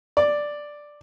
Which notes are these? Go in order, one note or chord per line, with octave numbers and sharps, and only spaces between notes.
D5